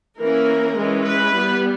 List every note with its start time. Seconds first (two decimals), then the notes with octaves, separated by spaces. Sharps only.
0.20 E3 A#3 C#4 A#4
0.77 E3 G#3 C#4
1.06 B4
1.35 G3 B3